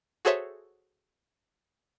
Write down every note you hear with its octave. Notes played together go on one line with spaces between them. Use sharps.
F#4 G#4 A4 C5 C#5 E5